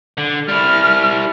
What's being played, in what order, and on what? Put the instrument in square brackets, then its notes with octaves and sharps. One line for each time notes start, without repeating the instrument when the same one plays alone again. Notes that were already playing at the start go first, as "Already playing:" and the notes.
[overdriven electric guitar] D3
[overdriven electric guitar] G3 E4 [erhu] F6